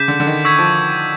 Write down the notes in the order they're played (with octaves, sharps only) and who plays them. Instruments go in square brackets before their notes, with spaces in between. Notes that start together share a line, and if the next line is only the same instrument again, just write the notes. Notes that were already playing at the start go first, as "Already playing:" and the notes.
Already playing: [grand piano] C#3 [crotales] D6 G6 B6
[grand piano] D3
D3
D#3
[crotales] C#6 E6 G#6 B6
[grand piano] F3